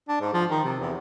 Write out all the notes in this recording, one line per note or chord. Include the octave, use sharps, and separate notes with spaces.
D4
G#2
F3
D#3
C3
E2